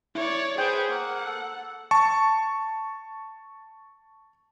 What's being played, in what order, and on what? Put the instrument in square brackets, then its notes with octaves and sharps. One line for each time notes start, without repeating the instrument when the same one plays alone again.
[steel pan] E4 [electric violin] C#5 D5
[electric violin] G#4 B4 [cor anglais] C5 [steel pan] G5
[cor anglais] A#3 [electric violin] F#5
[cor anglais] A4
[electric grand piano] A5 C#6